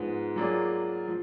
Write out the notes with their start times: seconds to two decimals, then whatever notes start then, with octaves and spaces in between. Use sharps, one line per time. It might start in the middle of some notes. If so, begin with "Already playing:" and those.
Already playing: G#2 F3 G#3 B3
0.36 F#3 A#3 D4 F4 G#4
1.08 F3